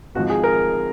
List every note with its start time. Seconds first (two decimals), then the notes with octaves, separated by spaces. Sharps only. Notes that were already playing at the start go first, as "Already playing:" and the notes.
0.15 G#1 G#2 F3 F#4
0.30 G#4
0.44 A#4